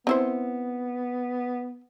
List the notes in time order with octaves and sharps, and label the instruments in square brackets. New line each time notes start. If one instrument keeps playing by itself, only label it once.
[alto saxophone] B3 [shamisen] C4 E4 C5